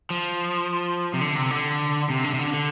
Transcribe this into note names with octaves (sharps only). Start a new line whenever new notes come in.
F3
C3
D3
C3
D3
C3
D3
C3
D3
D3